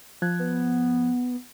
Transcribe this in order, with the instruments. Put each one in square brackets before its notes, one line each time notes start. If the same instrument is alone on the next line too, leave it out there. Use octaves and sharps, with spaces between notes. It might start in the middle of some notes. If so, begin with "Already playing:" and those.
[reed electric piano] F3 F#6 G#6
[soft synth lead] B3